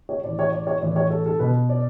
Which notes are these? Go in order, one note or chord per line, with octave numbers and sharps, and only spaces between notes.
C#5
A2 E3 D5
C#5
D5
C#5
A2 E3 D5
C#5
A4
A4
B2 B4
D5